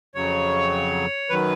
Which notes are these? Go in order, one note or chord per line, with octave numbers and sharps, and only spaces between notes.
F2 C#3 F#3 C#5
F#2 D#3 F#3 B4